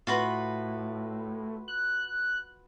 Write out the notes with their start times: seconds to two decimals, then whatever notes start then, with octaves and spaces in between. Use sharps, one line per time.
0.07 A2 F4 F#4 B4
1.68 F#6